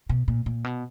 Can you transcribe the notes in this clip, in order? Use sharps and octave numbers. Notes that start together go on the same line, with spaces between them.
B2
A#2
A#2
B2